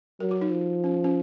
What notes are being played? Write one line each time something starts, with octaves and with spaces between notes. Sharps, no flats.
F#3 A#4
F#4
D#4
F3
C#4
C#4